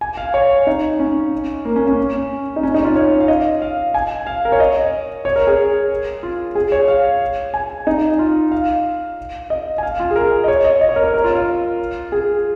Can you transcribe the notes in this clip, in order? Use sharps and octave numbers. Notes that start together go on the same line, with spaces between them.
G#5
F5
C#5
D#4
C#4
A#3
C#4
C#4
D#4
C#4
D#4
F4
C#5
F5
D#5
F5
G#5
F5
A#4
C#5
D#5
C#5
A#4
G#4
F4
G#4
C#5
F5
G#5
D#4
F4
F5
D#5
G#5
F5
F4
G#4
A#4
D#5
C#5
D#5
D#5
C#5
A#4
C#5
A#4
F4
F4
G#4